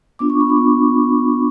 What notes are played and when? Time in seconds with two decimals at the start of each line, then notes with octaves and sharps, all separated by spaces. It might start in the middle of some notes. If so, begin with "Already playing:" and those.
0.19 B3 D4 F4 D6
0.30 C#6
0.40 B5
0.50 C#6
0.56 B3 D4 F4